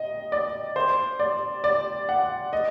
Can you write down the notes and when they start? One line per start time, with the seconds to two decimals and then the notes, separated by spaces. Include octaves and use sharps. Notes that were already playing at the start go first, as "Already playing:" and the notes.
Already playing: D#5
0.32 D5
0.76 C5
1.19 D5
1.64 D5
2.09 F#5
2.53 D#5